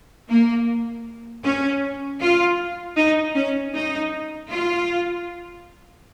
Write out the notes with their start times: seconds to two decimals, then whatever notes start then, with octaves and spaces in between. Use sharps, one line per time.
0.28 A#3
1.43 C#4
2.20 F4
2.96 D#4
3.35 C#4
3.73 D#4
4.50 F4